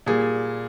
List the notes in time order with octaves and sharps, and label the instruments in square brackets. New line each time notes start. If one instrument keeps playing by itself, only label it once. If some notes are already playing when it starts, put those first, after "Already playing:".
[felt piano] A#2 G3 G#4